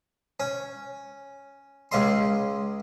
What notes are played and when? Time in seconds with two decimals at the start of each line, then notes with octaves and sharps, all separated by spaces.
0.40 C#4
1.92 C#2 C#3 D#5 C6